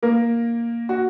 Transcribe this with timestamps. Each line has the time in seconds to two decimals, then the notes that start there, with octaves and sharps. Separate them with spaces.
0.03 A#3 A#4
0.89 F#4